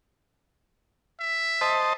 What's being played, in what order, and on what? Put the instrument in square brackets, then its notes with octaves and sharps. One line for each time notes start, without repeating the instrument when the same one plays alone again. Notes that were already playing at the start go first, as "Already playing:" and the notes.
[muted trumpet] E5
[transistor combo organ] C5 D#5 A5